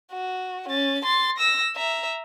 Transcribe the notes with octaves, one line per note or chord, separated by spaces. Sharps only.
F#4
C#4 A6
C6 A6
E6 A#6
E5 A#5